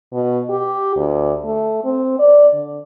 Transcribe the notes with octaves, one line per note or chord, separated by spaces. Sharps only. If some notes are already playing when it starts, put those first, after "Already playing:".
B2
G4
D2
A3
C4
D5
D3